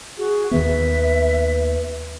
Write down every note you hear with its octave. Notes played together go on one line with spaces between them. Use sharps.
F#4 G#4
D#2 D#3 B3 B4 E5